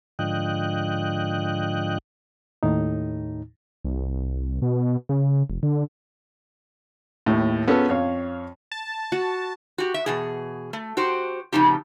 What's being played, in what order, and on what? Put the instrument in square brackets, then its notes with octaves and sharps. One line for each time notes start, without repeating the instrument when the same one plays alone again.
[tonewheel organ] G#2 D3 F3 D#5 G5 F#6
[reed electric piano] D#2 A2 D#4
[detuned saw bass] C2
B2
C#3
F1
D3
[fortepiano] D#2 A2
B3 C#4 F4 G#4 A4
F2 C#5 F5
[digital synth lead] A5
[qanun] F#4
[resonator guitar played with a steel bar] F#4 G4
E5
E2 B2 G#4
A3
F#4 G4 C5
F2 A2 C#3 D#4 G4